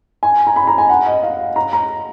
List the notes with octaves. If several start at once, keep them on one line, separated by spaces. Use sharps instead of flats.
G#5
A#5
B5
A#5
G#5
F#5
D#5
F5
A#5
A#5